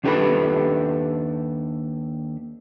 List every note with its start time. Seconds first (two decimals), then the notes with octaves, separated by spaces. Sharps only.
0.04 D#2 D4 G4 A4 B4 B5